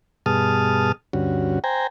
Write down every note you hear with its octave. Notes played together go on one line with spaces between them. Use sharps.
G2 B2 G#4 A5 D#6 F6
D2 G2 C#4 F#4
C5 G5 G#5 A#5